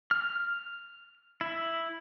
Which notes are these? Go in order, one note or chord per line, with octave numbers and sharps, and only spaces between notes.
F6
E4